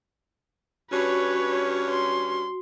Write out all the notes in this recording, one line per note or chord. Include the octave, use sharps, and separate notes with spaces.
G2 C#4 F#4 B4 C#5
C6